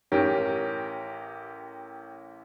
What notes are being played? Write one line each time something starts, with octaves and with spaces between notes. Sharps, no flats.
A1 C#4 G4 A#4